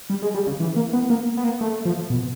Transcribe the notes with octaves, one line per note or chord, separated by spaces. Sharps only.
G3
G#3
G3
C#3
E3
A#3
B3
A#3
B3
A#3
A3
F3
B2